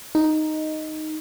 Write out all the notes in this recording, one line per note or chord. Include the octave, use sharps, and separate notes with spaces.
D#4